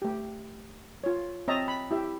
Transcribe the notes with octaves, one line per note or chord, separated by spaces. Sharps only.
A3 G4
F4 C#5
C4 C#5 D#5 E5 A5 A#5
B5
E4 G4 E5